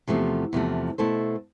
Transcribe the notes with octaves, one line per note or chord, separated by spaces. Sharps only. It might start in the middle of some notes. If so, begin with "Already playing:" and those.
E2 C3 F3 A3
E2 C3 F3 A3
B2 A3 E4 A4 C5